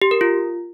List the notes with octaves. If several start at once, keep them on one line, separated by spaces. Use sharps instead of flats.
G4
A#4
F4